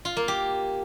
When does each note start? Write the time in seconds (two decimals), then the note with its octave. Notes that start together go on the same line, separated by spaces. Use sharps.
0.05 F4
0.17 A#3
0.28 G4